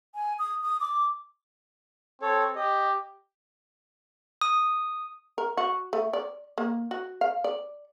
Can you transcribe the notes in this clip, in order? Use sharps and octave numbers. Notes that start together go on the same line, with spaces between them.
G#5
D#6
D#6
D6
C4 A4 C#5
G4 D#5
D#6
A#4
F#4
A3
D5
A#3
F#4
F5
D5